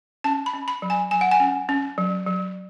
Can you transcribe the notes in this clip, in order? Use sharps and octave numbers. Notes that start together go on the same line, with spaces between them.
C#4 A5
B5
C#4
B5
F#3
G#5
F#3 G#5
F#5
G#5
C#4
C#4
F#3
F#3